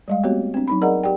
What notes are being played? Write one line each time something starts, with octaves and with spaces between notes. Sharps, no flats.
G3 G#3 F5
A3 B3 C4 F#4 G4 C#5
C4 D4
F#3 D#4 B5
G#4 A#4 D5 D#5 F#5 A#5
G4 D5 G5